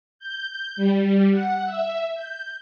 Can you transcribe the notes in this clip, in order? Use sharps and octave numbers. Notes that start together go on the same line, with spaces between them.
G6
G3
F#5
E5
G6